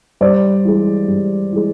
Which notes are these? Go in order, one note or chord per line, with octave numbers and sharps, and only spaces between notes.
G2 C5 D5
E3 G#3
G2
E3 G#3